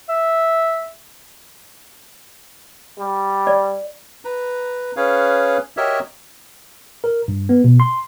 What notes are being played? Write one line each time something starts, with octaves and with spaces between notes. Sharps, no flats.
E5
G3
D5
B4 A#5
C#4 G#4 B4 C#5 F5
F#4 G4 A#4 C#5 D#5 E5
A#4
G2
B3
B2
C6